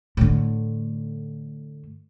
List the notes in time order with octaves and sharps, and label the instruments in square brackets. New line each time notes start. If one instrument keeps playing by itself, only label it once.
[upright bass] A2 D3